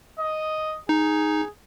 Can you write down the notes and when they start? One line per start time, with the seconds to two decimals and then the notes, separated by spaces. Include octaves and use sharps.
0.20 D#5
0.89 D#4 G#4